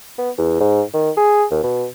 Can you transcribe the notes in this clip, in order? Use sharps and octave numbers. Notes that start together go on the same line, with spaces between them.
B3
E2
G#2
D#3
G#4
D#2
B2